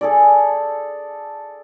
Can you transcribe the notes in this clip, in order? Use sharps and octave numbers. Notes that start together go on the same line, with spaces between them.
G#4 A4 D5